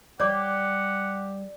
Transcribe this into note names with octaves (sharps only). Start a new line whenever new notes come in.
G3 G4 C#5 D5 F#5 D6